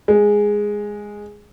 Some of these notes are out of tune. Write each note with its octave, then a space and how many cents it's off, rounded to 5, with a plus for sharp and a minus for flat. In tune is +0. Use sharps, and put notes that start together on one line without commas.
G#3 -5